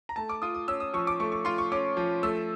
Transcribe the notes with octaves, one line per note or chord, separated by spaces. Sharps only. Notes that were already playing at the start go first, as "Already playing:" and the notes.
A#5
A3 A5
D6
F4 D#6
D#6
C#4 E6
D#6
F3 C#6
D6
A3 C#6
C#6
F4 C6
C#6
C#4 D6
F3
A3 E6